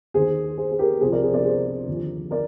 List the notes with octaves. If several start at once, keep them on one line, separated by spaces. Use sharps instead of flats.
D#2 D#3 G#4 C5
G#4 C5
G#4
G4 A#4
C2 C3 F3 G#4 C5
A#4 D5
G#4 C5
A#4 D5
G#4 C5
D#2 D3 F3
A#4 D5